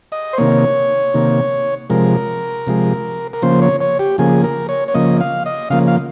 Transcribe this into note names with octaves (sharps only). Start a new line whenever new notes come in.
D#5
C5
C3 D#3 A#3 C#5
C3 D#3 A#3
C3 F3 G#3 A#4
C3 F3 G#3
A#4
C#3 F3 A#3 C5
C#5
C#5
G4
C#3 F3 A#3 G#4
A#4
C#5
C#5
C#3 F3 A#3 D#5
F5
D#5
C#3 F3 A#3 F5
F5